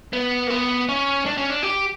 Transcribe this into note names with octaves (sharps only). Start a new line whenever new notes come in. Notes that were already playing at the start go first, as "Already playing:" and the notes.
B3
A#3
B3
C#4
D4
C#4
D4
G4